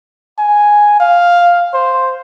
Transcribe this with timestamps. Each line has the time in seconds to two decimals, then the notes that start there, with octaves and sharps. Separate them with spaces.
0.39 G#5
1.00 F5
1.74 C5